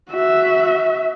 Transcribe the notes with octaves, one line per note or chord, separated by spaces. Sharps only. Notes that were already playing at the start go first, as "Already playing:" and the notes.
F#4 E5